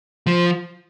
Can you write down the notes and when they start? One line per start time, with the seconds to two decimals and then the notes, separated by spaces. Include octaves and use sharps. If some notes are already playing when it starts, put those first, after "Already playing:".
0.27 F3